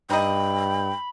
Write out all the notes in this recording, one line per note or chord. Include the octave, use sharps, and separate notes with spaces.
G2 D#4 D#5 G5 B5